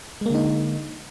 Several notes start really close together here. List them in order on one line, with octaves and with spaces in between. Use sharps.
G#3 A#3 D3 D#4